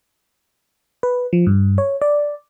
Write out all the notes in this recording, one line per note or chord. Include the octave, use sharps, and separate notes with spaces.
B4
F3
G2
C#5
D5